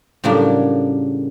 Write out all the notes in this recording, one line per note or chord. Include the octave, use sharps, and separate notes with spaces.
A2 C#3 F#3 G3 A#3 D4